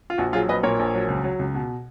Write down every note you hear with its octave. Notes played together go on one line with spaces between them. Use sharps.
F4
A#1 F#4
F#3 F4 G#4
A#1 B4 D#5
A#2 A#4 C#5
A#1
F#3
C#2
F#3
C#2
B2